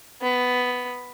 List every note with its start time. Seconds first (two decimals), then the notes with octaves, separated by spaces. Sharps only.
0.22 B3